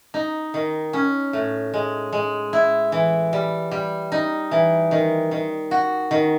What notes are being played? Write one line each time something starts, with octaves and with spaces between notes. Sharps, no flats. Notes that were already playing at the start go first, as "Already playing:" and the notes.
D#4
D#3
C#4
A2
G#3
G#3
E4
E3
G3
G3
D#4
E3
D#3
D#3
F#4
D#3